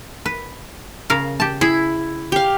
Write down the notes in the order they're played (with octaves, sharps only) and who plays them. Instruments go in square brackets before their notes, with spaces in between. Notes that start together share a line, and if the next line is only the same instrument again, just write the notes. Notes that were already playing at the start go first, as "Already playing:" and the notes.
[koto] B4
C#3 A#4 F5
G4 A5
[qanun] E4 [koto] G#4
[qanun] G4 F5